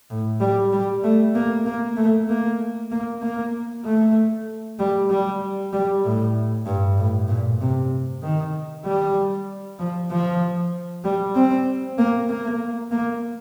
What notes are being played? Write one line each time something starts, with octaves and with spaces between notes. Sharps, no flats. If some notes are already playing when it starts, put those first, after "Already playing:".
A2
G3
G3
A3
A#3
A#3
A3
A#3
A#3
A#3
A3
G3
G3
G3
A2
G2
A2
A#2
C3
D#3
G3
F3
F3
G3
C4
A#3
A#3
A#3